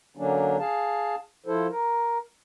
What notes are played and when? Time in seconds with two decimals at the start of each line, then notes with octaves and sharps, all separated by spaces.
0.17 D3 F#3 A#3 C#4 D4
0.59 G#4 F5 A5
1.46 F3 E4 A4 C5
1.70 A#4